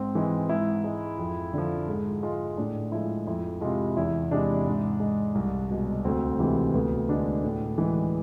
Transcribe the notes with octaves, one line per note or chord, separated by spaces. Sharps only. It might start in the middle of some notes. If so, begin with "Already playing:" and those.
Already playing: G#2 C4
E3 G#3
G#2 E4
G#3
F2
D3 F3
G#2 G#4
G#3 F4
A2 D4
F3 G#3 E4
F2 E4
C3 G#3 F4
E2 E4
C3 G#3 D4
G#2
G#3
C2
B2 G#3
D2 C4
C3 E3 G#3
D2 B3
D3 G#3 D4
A2
E3 G#3